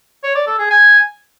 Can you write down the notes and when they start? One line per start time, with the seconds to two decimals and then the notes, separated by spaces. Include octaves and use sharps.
0.23 C#5
0.35 D5
0.47 A4
0.59 G#4
0.70 G#5